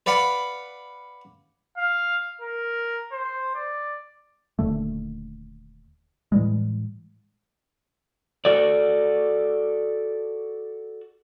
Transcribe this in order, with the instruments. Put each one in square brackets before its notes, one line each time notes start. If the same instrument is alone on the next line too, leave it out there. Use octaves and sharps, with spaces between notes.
[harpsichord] B4 D5 F5 F#5 B5
[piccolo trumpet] F5
A#4
C5
D5
[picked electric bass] D#1 D#2 D3 A3
A2 E3 G3 G#3
[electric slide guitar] F#4 A4 D5